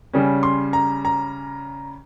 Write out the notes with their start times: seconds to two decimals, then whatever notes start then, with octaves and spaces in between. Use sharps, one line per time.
0.13 C#3 G3 C#4
0.43 C6
0.73 A#5
1.05 A#5